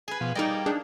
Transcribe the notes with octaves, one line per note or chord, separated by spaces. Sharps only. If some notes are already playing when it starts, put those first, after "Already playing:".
G#4 B4 G#5
B2 F3
G3 A#3 D#4 A#4 D5 D#5
D4 D#4 G#4